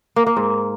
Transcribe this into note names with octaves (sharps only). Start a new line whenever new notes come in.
A#3
A#3
G#2